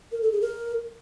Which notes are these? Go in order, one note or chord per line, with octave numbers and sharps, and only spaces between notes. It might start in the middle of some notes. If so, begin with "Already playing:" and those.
A#4
A4
G#4
A#4